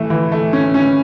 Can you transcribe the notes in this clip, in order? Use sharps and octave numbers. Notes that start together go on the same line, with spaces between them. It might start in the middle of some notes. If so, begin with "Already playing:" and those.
Already playing: E3 A3
E3
A3
C#4
C#4